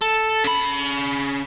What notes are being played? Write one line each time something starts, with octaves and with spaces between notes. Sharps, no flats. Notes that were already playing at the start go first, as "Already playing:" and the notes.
A4
C#3 B5